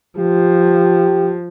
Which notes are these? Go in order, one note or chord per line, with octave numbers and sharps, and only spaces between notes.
F3 G4